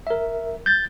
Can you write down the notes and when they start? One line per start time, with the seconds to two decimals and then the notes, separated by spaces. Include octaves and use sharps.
0.07 A#4 E5
0.66 G6 A6